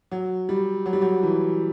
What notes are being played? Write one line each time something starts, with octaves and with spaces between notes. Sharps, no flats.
F#3
G3
F#3
G3
F#3
E3